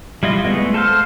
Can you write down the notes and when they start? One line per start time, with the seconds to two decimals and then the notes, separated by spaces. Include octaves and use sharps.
0.23 G3 E4 F4 D#5
0.44 G#3 A3 B3
0.74 A4 C5 F5